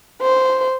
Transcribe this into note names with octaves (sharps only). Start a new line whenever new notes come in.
C5